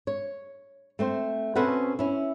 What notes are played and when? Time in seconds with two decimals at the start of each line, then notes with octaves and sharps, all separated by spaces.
0.07 C#5
0.99 A3 C4 C5
1.56 B2 C4 C#4 A4 B4 F#5
1.99 C#4 E4